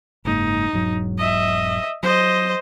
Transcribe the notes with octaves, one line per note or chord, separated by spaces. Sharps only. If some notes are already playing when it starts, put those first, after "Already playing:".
F#1 G#2 A#3 D#4
E1 G#2 F#3
D#5 E5
F#3 C5 D#5